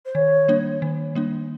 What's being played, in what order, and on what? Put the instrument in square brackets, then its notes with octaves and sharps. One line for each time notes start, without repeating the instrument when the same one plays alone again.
[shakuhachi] C5
[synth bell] D#3 [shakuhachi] C#5
[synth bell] G3 A#3 D4
D#3
G3 A#3 D4